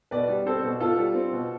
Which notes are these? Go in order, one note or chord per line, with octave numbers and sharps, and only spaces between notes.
B2 B4 D5
G3
C4 A4 C5
B2
B2 F4 A4
G3
C4
B2